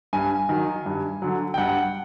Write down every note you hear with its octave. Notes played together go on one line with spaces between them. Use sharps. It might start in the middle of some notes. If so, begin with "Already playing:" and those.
G2 G#5
D#3 F#3
G2
D3 F#3
G5
G2 F#5